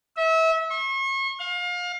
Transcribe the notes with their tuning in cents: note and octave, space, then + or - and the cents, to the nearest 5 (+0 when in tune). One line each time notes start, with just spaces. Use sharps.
E5 -30
C#6 -40
F5 +30